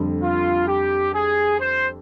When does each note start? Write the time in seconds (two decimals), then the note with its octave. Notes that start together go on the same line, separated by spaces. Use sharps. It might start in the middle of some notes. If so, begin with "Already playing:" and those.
Already playing: F2 D3 G3
0.22 F4
0.68 G4
1.14 G#4
1.59 C5